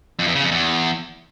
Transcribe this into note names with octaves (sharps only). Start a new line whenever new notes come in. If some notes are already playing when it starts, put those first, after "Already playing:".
F2
E2
C#3
F2
E2